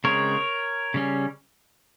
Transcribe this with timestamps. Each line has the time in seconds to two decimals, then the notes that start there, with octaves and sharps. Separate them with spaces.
0.04 C#3 G#3 C4 A#4 C#5
0.94 C#3 G3 C#4